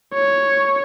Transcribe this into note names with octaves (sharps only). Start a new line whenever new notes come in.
C#5